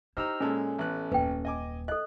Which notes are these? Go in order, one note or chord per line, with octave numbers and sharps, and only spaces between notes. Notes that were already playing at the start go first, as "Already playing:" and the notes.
D#4 E4 G4 C5 A#5 E6 F6
A#2 G#3 C#4 A4 A5
A1 B3 F#6
D#1 F#2 B4 G5
D#5 G#5 D6
A4 D#5 F#6